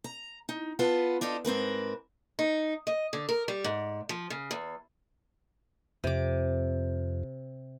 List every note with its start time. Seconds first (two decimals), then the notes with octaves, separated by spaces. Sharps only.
0.04 A#5
0.49 D#4
0.79 B3 F4 B4 A5
1.21 D4 D#4 F4 A4
1.45 G#2 C4 A#4 B4
2.39 D#4
2.87 D#5
3.13 D3
3.29 A#4
3.48 G3
3.64 G#2
4.09 F3
4.30 C#3
4.51 E2
6.04 F2 C3 D6